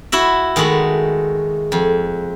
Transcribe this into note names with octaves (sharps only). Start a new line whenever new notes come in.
E4 F#4 E5
D#3 G#3 A3 F#4 B5
F2